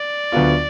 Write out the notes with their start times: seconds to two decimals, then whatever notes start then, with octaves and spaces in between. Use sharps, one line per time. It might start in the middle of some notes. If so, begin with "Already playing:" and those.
Already playing: D5
0.32 D2 D3 F#3 B3 F4